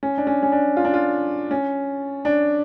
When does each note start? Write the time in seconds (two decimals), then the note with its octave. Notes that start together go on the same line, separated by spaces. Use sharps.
0.03 C#4
0.18 D4
0.27 C#4
0.43 C#4
0.52 D4
0.77 F4
0.84 D4
0.94 F4
1.51 C#4
2.25 D4